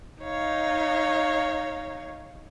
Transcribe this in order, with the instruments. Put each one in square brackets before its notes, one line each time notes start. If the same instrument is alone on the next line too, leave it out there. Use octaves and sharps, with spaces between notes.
[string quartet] D#4 C#5 F5